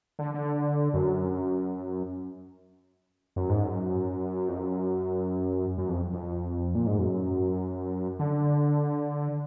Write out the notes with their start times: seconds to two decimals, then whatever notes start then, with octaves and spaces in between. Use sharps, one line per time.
0.19 D3
0.34 D3
0.94 F#2
3.36 F#2
3.49 G#2
3.64 F#2
4.48 F2
4.57 F#2
5.78 F#2
5.89 F2
6.13 F2
6.75 A#2
6.87 G#2
6.99 F#2
8.19 D3